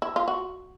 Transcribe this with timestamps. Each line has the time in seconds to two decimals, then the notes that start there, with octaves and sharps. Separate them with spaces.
0.02 E4
0.16 F4
0.28 F#4